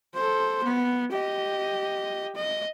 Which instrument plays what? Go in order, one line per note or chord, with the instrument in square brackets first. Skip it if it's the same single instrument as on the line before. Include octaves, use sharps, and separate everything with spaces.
[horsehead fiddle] A4 C5
B3
G4 D#5
D#5